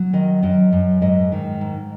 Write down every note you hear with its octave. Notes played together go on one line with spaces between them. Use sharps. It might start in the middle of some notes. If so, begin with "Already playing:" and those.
Already playing: F#3
D#3 D#5
F#2 D#5
F#2
G#2 D#5
D#3
G#2